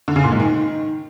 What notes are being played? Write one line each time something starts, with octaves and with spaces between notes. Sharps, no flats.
D3
C#3
A#2
G#2
D#3